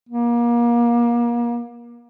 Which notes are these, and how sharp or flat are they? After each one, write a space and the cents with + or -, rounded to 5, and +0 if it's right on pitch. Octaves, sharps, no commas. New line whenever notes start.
A#3 +30